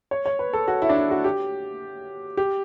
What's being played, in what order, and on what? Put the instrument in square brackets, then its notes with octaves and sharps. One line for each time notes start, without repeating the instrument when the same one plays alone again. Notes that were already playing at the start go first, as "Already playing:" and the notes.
[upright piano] C#5
C#5
B4
A4
F#4
E4
D4
E4
F#4
G4
G4